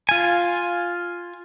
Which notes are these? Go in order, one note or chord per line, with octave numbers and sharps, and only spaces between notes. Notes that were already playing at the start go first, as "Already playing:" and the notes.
F4 G#5